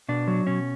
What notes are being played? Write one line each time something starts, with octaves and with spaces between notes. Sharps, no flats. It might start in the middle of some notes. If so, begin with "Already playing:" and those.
B2 D4
F#3
B2 C#4